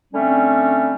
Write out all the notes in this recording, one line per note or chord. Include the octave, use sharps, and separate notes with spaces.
D3 G3 A3 C4 C#4